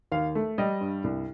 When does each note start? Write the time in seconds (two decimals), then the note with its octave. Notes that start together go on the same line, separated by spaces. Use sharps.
0.12 D#2 F5
0.35 A3
0.58 G3 D#5
0.81 G2
1.04 C2